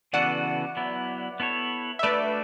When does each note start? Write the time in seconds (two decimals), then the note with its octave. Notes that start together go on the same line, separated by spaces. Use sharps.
0.13 C#3 E3 B3 F#4 A4 D5 F#5
0.77 F#3 B3 E4
1.40 B3 E4 A4 C#5
1.99 E5
2.03 A3 D4 F#4 B4 D5